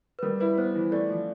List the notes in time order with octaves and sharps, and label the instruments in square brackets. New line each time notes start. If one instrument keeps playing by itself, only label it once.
[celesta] B4
[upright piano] G3 [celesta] A#4
[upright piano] E4 [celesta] B4
[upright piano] B3 [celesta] C5
[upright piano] E3
[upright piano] A3 [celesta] D5
[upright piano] F3